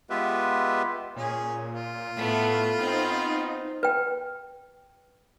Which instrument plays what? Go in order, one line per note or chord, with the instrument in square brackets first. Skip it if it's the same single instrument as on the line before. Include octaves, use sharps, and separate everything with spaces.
[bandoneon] G#3 B3 F4 G4 B4 E5
[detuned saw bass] A#2 [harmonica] C#4 G#4
[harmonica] F4
[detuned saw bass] A2 [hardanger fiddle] A3 B3
[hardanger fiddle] B3 C4 [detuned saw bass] D#4
[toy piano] B4 G5